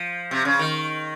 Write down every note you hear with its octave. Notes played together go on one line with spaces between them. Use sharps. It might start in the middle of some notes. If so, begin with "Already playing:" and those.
Already playing: F3
C3
C#3
D#3